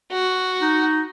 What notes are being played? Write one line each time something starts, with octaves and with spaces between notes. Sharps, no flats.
F#4
D#4